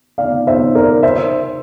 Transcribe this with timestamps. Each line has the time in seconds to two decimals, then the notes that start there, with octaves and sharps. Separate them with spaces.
0.18 D5 F5
0.47 C5 E5
0.75 A#4 D5
1.03 C5 E5